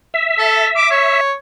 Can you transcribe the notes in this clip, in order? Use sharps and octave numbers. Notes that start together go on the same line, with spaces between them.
E5
A4
D6
C#5